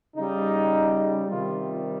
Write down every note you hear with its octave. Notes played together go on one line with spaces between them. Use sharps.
C#3 G3 D#4
C3 D#3 G3 F4